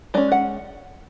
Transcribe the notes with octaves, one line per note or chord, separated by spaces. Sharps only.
G#3 C#4 D5
F#5